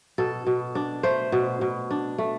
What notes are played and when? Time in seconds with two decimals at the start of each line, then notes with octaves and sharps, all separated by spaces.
0.18 B2 A4
0.46 B2
0.75 D4
1.03 A3 C5
1.32 B2
1.61 B2
1.91 D4
2.18 A3